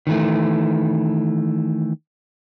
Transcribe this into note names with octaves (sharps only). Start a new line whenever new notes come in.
D#3 E3 A3